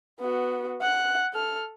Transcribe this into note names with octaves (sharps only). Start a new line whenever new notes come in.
B3 F#4
F#5 F#6
A4 F6